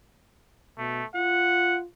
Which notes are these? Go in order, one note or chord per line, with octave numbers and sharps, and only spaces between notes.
B2 A3
F4 F#5